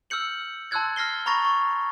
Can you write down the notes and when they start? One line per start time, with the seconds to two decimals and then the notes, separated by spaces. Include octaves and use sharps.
0.10 E6 F6 G6 C#7 F#7
0.71 A5 C6 E6 F#6 G#6 A6
0.96 F6 A#6 C7 G7
1.26 A#5 B5 C#6 A6 A#6 F7
1.45 C#6